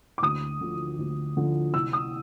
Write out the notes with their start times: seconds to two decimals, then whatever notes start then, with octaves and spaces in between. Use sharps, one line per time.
0.18 D6
0.23 D2 D#6
0.61 D3 F3
0.99 D2
1.37 D3 F3
1.74 C2 E6
1.93 D#6